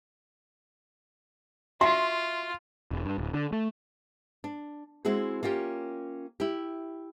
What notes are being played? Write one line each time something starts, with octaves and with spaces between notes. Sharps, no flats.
F4 F#4 E5 C6
E1
G2
D1
D3
A3
D4
G#3 C4 E4 F#4 G#4
A#3 C#4 F4 G4
E4 G4